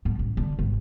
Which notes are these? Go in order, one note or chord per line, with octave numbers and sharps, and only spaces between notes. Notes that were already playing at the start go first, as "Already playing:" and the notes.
A2
A1
D3
G#1